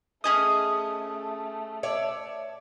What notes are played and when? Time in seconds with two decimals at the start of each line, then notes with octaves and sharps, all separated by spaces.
0.24 A3 C#4 G#4 D#5 D#6
1.83 C#5 D5 E5